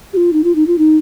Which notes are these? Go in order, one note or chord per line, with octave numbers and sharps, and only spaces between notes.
G4
F4
D#4
F4
D#4
F4
D#4